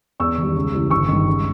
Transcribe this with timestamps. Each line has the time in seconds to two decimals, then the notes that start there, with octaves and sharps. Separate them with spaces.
0.20 E2 C#6 E6
0.38 D#3 G3
0.55 C#2
0.73 C#3 E3 G3
0.90 G1 C#6 E6
1.08 G2 D#3
1.27 C#2